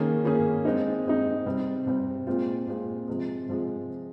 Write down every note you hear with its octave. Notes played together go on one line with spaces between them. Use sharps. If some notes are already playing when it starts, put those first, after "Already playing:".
Already playing: D#3 A#3 C#4 G#4
D#3 A#3 C#4 G#4
G#3 C4 D#4
G#3 C4 D#4
C3 G3 C4
C3 G3 C4
A#2 G#3 C4 F4
A#2 G#3 C4 F4
C3 F3 G#3
C3 F3 G#3